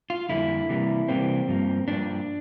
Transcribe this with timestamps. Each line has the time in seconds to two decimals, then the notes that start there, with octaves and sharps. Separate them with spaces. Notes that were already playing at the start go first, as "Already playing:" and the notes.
0.10 F4
0.29 F2 D3 G3 A#3 E4
0.69 C3 E3 G3 A#3
1.09 C3 E3 G3 A#3 C4
1.48 G2 F3 A#3
1.87 G2 F3 A#3 D4